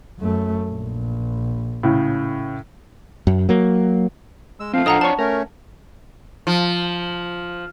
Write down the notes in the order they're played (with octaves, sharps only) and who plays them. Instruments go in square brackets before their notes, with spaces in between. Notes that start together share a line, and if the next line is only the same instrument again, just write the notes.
[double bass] F#2 A3
A#1
[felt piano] A2 C#3
[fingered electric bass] F#2
F#3 A#3
[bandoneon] G#3 E6
[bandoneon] F3 F5 [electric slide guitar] A3 C4
[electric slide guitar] D4 A4 D#5 [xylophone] F#5 A#5 D#6
[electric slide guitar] D4 C#5 [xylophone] A5 C#6
[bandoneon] A3 C#4 [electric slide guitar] A#4
[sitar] F3